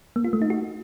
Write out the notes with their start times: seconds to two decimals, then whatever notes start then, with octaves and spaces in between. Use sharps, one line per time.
0.16 A#3
0.24 F4
0.33 A3
0.42 D#4
0.50 F#4